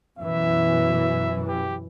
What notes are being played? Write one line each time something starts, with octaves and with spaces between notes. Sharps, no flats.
F#2 B2 E3 E5
G4